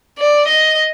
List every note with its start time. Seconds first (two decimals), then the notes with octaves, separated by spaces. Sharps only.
0.19 D5
0.48 D#5